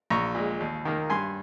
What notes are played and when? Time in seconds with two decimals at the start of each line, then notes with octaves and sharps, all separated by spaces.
0.10 A#1 A#5 C#6
0.35 A#2 G#3
0.60 D#2
0.85 D#3 A#3
1.10 G2 G#5 C6